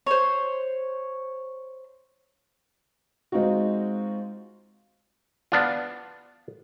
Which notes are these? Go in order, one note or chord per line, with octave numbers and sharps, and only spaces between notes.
C5 C#5
G#3 C4 D#4 F4 F#4
B3 D4 F4